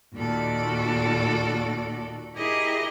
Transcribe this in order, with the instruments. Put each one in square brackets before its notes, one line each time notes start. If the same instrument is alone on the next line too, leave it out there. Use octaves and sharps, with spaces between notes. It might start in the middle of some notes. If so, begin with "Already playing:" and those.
[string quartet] D#2 A#2 F#4 A4 D5
E4 G4 G#4 A#4 D#5